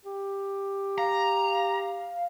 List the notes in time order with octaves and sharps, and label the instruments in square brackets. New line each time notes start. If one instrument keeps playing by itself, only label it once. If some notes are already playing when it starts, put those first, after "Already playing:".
[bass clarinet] G4
[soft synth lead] F5 [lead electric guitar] A#5